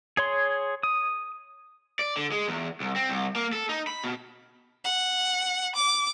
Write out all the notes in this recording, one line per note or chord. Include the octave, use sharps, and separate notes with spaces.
G#4 C#5 C6
D#6
D5
D3
G#3
E2
C2
C4
C2
A#3
A4
D#4
B5
B2
F#5
D6